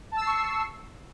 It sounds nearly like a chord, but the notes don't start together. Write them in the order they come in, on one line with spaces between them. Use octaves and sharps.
A5 E6 C7 C#6